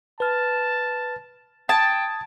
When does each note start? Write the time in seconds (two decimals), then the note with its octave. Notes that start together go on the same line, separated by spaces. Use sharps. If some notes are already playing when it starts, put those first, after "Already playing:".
0.20 B4 A5 F6
1.69 G5 A5 D#6 G#6 A6